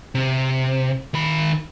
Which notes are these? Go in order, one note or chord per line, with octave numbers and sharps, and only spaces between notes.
C3
D#3 B5